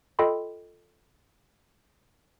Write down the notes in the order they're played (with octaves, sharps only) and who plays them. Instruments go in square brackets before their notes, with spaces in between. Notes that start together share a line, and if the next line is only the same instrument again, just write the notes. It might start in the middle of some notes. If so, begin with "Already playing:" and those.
[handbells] F4 A4 D#5 G5 B5 C6